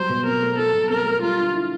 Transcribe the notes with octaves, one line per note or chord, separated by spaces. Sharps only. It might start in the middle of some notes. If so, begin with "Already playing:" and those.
Already playing: F#3 G3 C5
B2
C4 A#4
A3
F#3 A4
B2
C4 A#4
A3
G3 F4
D3
E4